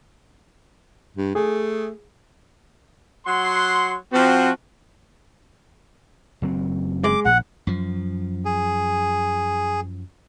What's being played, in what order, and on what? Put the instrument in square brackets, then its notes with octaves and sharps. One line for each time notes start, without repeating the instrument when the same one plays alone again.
[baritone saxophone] G2
[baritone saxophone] A3 [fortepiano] G#4
[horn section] F#3 F#5 C6
[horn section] F3 F#4 [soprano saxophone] C4
[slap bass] F#1 F#3 C4
[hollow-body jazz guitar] G#3 [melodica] D6
[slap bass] A#1 [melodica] F#5
[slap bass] F#2 F3
[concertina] G#4